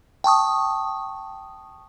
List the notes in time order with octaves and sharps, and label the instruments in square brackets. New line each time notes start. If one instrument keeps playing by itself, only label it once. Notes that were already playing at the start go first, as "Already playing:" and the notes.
[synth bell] G5 A5 C#6 D#6